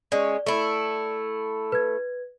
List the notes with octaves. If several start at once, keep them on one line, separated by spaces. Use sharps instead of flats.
G#3 C#4 D5
A3 E4
B4 G#6